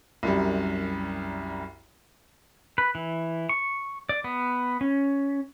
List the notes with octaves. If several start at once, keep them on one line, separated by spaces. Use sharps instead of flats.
C2 F#2 G3
B4
E3
C#6
D5
B3
C#4